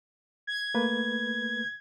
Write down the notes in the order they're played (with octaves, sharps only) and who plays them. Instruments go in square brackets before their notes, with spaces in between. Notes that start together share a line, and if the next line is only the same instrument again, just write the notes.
[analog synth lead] G#6
[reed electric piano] A3 A#3 B4